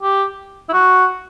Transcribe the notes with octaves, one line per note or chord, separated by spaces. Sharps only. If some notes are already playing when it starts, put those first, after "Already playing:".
G4
E4
F#4